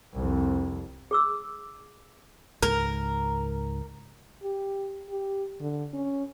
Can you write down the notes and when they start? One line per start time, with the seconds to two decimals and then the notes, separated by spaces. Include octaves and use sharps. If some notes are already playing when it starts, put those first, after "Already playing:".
0.14 C2 F2
1.11 G#4 D6 E6
2.63 C#2 G#2 A#4
4.43 G4
5.10 G4
5.61 D3
5.93 C#4